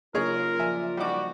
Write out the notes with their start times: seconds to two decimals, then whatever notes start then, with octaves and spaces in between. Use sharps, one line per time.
0.14 C#3 F#3 A#3 D#4 F4 G#4 A#4 C#5
0.59 F3 D5 E5 G#5
0.97 G3 D#4 F#4 D6